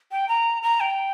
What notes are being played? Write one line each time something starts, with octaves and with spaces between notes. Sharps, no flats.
G5
A#5
A#5
G5